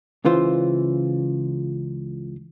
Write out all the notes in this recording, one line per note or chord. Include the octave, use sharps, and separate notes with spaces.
C#2 C#3 E3 F4 C5